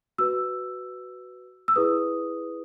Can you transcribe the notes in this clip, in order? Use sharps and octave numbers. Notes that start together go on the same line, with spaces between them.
F#4 B4 E6
E6
E4 G#4 B4 D#6